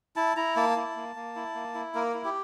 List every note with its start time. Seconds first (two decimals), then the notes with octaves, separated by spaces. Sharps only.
0.16 E4 A5
0.37 E4 A#5
0.56 A#3 A5
0.76 E4
0.96 A#3
1.16 A#3
1.36 E4
1.55 A#3
1.74 E4
1.95 A#3 A#4
2.14 E4
2.24 G4